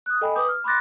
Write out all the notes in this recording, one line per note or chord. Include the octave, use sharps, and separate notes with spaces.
D#6 F#6
A4 D#5 G5 G#5 B5
B4 D6 D#6 G6
F6
B5 C6 D6 F#6 A6 A#6